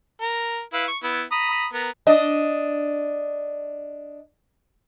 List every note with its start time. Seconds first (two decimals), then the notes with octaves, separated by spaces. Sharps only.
0.21 A#4
0.73 E4 B4 F5
0.88 C#6
1.03 B3 E4
1.32 A#5 B5 D#6
1.73 B3 A#4
2.07 D4 D#5